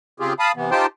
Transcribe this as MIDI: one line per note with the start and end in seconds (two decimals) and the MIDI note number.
0.20 0.33 49
0.20 0.33 60
0.20 0.33 65
0.20 0.33 67
0.20 0.33 68
0.39 0.52 77
0.39 0.52 81
0.39 0.52 83
0.39 0.52 87
0.56 0.71 48
0.56 0.71 52
0.56 0.71 59
0.71 0.86 63
0.71 0.86 65
0.71 0.86 67
0.71 0.86 72
0.71 0.86 79
0.71 0.86 81